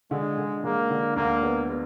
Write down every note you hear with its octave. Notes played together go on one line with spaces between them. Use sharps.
D3 G#3
D3
G#3 A#3
D3
D2 A#3
B3
B3